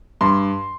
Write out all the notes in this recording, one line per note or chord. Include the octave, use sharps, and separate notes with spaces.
G2 C6